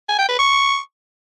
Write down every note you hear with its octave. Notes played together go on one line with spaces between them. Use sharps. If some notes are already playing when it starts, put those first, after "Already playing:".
G#5
G5
B4
C#6